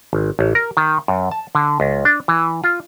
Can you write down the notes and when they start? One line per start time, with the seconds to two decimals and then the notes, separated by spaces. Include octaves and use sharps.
0.13 G#1
0.39 A1
0.55 A#4
0.77 D#3
1.08 F#2
1.31 A5
1.55 D3
1.80 C#2
2.05 D4
2.28 E3
2.64 F4